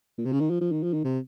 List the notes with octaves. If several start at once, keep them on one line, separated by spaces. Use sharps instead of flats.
A#2
C3
C#3
D#3
F3
F3
D#3
F3
D#3
C3